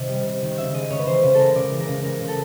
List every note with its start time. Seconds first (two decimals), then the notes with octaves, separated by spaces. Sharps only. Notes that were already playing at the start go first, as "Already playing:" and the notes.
Already playing: C3 D#3 D#5
0.09 G3
0.26 C3
0.42 D#3
0.58 C#3 E5
0.74 G#3 D#5
0.90 C#3 C#5
0.99 B4
1.06 E3 C5
1.23 C#3 B4
1.35 G#3 A4 A#4
1.55 C#3 D5
1.71 E3
1.80 A#4
1.88 C#3
2.04 G#3 A#4
2.21 C#3
2.28 A4